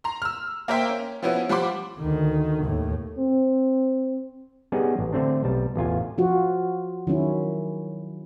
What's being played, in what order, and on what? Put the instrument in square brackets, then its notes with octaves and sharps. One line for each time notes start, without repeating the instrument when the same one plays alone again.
[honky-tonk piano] A#5 C6
E6 F6
A#3 A#4 C5 E5 G5
C#4
F3 B3 C#4 E4 F#4
F3 G3 F#5 B5 C6 D6
[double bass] D2 D#3
D#2 A2
[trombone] C4
[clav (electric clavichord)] G3 B3 C#4 D#4 G#4
A1
D3 A3 C4 D4
B1 G3 A5
A1 E2 F4 G#5
[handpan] F3 F4 F#4
D#3 F#3 C#4 E4